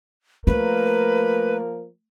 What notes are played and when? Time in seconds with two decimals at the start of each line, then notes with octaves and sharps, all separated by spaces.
0.47 F3 A3 A#3 A#4 B4